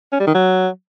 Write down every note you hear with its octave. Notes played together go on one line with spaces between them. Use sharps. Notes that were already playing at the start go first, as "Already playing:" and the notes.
C#4
G3
D#3
F#3